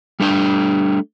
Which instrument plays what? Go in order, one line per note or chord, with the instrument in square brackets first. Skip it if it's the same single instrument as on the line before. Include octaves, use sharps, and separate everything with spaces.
[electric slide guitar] G3 A3 D4 F5 G5